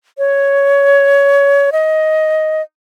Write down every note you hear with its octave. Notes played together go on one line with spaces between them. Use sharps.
C#5
D#5